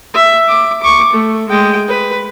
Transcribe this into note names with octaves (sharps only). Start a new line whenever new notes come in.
E5
D6
C#6 D6
A3
G#3 G5
B4